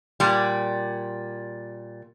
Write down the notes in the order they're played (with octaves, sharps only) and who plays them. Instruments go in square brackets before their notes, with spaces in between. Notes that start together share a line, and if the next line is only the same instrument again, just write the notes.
[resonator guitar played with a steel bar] A#2 G3